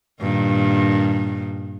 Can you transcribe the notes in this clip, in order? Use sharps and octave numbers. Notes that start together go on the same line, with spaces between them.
G2 A#2 D#3